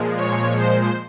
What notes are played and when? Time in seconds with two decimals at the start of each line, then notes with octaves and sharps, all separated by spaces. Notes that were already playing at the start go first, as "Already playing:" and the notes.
Already playing: A#2 F3 G#3
0.17 C#5
0.58 C5